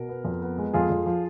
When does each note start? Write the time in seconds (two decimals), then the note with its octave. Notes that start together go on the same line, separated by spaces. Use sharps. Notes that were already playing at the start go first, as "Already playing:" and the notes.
Already playing: B2 A#4
0.09 B3
0.24 F2
0.42 B3
0.58 G#3
0.73 F2 F4 G#4
0.90 F2
1.06 F3